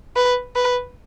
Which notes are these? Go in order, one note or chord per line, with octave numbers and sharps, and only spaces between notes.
B4
B4